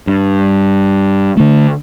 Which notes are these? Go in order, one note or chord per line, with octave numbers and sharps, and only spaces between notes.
G2
D3 A3